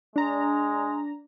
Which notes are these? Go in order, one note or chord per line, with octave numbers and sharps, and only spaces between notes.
G#3 D4 A#5